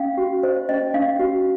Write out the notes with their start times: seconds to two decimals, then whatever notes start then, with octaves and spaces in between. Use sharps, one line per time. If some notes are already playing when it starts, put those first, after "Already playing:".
Already playing: C#4 F5
0.18 F#4
0.43 C5 D#5
0.69 C#4 D#5
0.94 C#4 F5
1.19 F#4